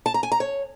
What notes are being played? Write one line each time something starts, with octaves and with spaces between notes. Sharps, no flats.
A5
A#5
G#5
A#5
C#5